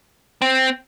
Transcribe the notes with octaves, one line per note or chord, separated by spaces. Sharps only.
C4